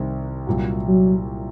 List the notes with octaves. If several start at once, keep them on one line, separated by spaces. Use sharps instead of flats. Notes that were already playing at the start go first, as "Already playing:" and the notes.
Already playing: C2 C3 D#3
C2 A#2 F#3
F#3